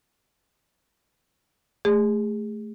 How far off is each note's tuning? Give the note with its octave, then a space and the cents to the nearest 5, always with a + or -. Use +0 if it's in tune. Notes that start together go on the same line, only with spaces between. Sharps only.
A3 -15 G#4 -30